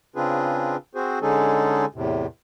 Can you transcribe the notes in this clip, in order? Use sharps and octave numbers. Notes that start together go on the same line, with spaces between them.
C#3 C4 D4 F4 G#4 B4
C4 F#4 G#4 C5
D3 G#3 C#4 D#4 G#4 A4
E2 A2 C3